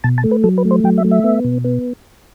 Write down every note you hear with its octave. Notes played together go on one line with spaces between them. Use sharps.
B2 A5
A5
A3
B4
F#3 A4
B4
A3
C5
F#3 G5
E5
A3
E5
B3
B2
B3